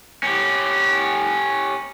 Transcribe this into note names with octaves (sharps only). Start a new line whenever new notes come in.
C#4 G4